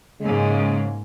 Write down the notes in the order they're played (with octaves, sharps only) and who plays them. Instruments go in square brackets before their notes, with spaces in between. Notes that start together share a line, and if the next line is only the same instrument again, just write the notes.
[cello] G#2 A#3 [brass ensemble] C#3 G#3